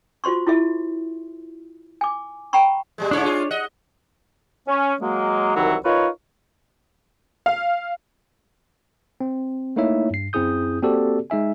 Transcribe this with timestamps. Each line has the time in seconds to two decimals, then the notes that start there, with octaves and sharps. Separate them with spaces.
0.24 F4 F#4 C5 C6 C#6
0.47 E4 F4 G#4 E5
2.01 G#5 D6
2.53 G5 A#5 B5 C#6
2.98 A#2 G3 G#3
3.11 G2 C#3 D4 E4 C#5
3.24 F4 G#4
3.51 D#5 F#5
4.67 C#4
5.01 F#3 G#3 A#3
5.56 C2 D#3 E3 F#3 E4 F#4
5.85 D#4 F4 A#4 B4 C#5
7.46 F5
9.21 C4
9.76 A3 A#3 D#4 E4 C#5 E5
10.10 G2 C7
10.33 F#2 C4 E4 G#4 D#6 G6
10.82 A#3 C4 F#4 G4 A4 D5
11.30 G#3 D#4 E5 G#5